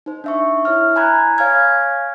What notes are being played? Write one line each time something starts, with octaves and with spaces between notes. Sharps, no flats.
D#4 C5
D4 E5 C#6
E4 C#5 E5 F6
G#5 A#5 B5 F#6 G#6
C#5 F5 G#5 F6 G#6